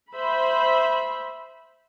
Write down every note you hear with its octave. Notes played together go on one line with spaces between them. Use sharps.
C5 E5 B5